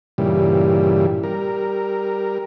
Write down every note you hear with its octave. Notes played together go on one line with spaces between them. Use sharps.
G2 A#2 C#3 E3 G3
G3 A#4